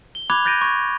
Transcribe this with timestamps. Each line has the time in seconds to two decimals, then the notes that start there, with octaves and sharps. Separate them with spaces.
0.15 G7
0.30 B5 D6 F#6 G#6 F7
0.45 F#6 G6 A6 A#6 D7 D#7
0.61 C#6 G#6